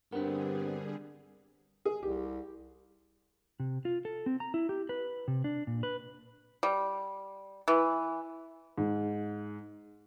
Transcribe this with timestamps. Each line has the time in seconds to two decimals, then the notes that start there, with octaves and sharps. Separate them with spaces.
0.12 G2 D3 G3 B3 C4 D4 G#4 A#4
1.85 G#4
2.03 C2 G4
3.60 C3
3.85 F4
4.05 A4
4.26 C4
4.40 A#5
4.54 E4
4.69 G4
4.89 B4
5.28 C3
5.44 D4
5.67 A#2
5.83 B4
6.63 G3
7.68 E3
8.78 G#2